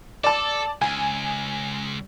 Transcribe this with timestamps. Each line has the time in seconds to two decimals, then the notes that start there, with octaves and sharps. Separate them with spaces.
0.24 A4 D5 A5
0.82 C#2 G#5